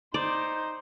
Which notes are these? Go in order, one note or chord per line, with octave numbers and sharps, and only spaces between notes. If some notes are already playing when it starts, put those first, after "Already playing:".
D#4 C5 D5